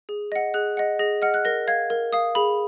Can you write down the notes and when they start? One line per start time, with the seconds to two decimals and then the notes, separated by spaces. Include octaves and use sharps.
0.09 G#4
0.32 D#5 F#5
0.54 G#4 F#6
0.77 D#5 F#5
0.99 G#4 A#6
1.22 D#5 F#5 F6
1.34 F#6
1.45 A#4 A#6
1.68 F5 G#6
1.90 A#4
2.13 F5 D#6
2.35 G#4 B5